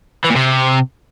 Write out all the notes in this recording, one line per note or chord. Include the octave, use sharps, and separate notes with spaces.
E3
A#2
C3